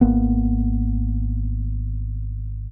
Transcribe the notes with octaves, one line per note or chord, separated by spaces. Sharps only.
G#1 A#3 B3